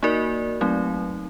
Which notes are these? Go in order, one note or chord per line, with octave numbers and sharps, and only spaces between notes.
A#3 D#4 F#4 A#4 D5
F#3 A3 C4 D#4